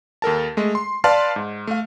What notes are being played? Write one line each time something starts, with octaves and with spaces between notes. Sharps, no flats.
D#2 A4 A#4 A5
G#3 A3
C6
B4 D5 F5 A5 C6 F6
G#2
A3 F5